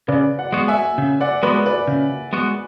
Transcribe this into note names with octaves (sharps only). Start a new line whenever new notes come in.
C#3 B4 D5
D5 F#5
G#3 B3 F#4
E5 G#5
C#3
D5 F#5
G#3 B3 F#4 B4 D5
B4 D5
C#3
G#3 B3 F#4